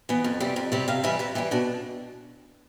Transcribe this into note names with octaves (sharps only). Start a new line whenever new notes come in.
E3 B3
F2
C3 G3 C4
F2
C3 G3 C4
C3 F5
E3 G3 E5
C3 B4
E3 G3 G4
B2 D4